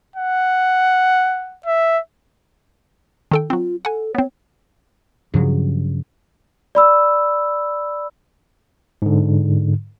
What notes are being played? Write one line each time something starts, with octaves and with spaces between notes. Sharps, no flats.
F#5
E5
D#3 A4 G5
F#3 C4 F4
A4 F#5 G#5
B3 C4 C#5
G2 C#3 F3 F#3
D5 B5 E6
G#2 D3